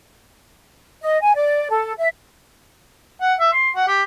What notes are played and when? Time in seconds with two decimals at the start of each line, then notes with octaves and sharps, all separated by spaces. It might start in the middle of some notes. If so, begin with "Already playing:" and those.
1.03 D#5
1.21 G#5
1.36 D5
1.70 A4
1.98 E5
3.21 F#5
3.40 E5
3.53 C6
3.76 F#5
3.88 G4